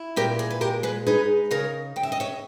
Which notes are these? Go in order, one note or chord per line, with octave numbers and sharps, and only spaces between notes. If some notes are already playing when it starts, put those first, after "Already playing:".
Already playing: E4
A#2 G4 A#4
G#4
B4
G#3 G4 A#4
G#4 B4
D#4 G#4 B4
C#3 A#4 C#5
C#3 G5
E5
D#5
C#5 E5